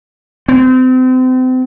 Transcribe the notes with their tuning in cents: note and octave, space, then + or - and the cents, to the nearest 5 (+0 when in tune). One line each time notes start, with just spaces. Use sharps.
C4 -35